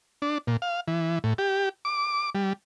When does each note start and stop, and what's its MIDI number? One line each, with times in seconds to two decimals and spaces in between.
0.22 0.38 62
0.47 0.57 46
0.62 0.80 77
0.88 1.19 52
1.24 1.34 45
1.38 1.69 67
1.85 2.30 86
2.35 2.53 55